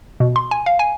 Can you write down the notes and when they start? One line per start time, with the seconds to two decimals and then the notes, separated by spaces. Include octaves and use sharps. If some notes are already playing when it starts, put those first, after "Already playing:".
0.20 B2
0.36 C6
0.51 G#5
0.66 F5
0.79 G#5